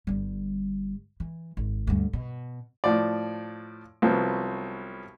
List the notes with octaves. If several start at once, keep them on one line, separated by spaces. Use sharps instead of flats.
G1 G3
E3
G#1
D2 G2
B2
A2 F3 D5
C2 F3 F#3 B3